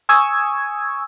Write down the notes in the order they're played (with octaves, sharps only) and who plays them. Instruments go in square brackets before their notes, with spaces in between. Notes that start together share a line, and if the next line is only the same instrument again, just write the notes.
[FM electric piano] G#5 C#6 D#6 E6 G#6